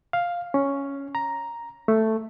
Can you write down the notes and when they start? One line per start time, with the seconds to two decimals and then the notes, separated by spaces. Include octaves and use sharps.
0.13 F5
0.54 C#4
1.15 A#5
1.88 A3